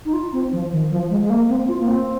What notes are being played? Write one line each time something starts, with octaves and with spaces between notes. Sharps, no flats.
D#4
F4
C4
F3
D#3
F3
G#3
G#3
A#3
C4
F4
A#3
C4